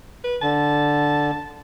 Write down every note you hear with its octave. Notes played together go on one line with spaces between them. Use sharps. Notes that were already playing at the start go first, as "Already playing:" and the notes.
B4
D3 A5